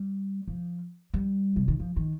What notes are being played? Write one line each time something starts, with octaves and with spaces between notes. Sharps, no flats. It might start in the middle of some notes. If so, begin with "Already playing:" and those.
Already playing: G3
F3
G3
C3
D#3
F3
D#3